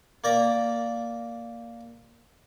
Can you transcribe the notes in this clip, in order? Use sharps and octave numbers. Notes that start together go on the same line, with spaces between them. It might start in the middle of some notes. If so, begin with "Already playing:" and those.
A#3 D5 A#5